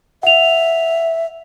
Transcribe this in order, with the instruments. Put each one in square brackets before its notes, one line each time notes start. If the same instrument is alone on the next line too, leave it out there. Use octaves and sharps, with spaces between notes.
[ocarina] E5 [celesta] F#5 F7